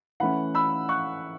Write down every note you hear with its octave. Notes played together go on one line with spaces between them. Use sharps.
E3 A3 C#4 F#5 B5
B5 E6
C#6 F#6